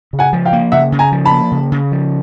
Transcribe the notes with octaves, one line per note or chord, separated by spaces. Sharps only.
C#3
F#5 G#5
F3
F5 G5
A#3
C#3 E5 F#5
C#3
G#5 A#5
F3
A5 B5
A#3
C#3
C#3
F3